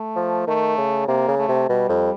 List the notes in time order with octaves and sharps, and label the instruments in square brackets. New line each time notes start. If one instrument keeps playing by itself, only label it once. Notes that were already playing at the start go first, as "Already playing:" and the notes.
Already playing: [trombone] A3
[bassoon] F3
[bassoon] D#3 [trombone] A3
[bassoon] C#3
[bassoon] C3 [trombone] A#3
[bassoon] C#3
[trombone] A3
[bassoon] C3
[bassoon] B2 [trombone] G3
[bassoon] F2